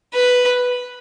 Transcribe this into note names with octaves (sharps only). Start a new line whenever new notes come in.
B4